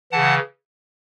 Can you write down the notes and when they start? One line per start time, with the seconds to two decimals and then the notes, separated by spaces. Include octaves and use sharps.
0.12 C#3 E3 F#5 A5